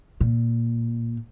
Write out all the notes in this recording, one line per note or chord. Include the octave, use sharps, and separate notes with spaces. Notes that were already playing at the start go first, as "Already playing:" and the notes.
A#2